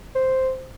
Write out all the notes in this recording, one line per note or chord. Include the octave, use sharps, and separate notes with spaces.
C5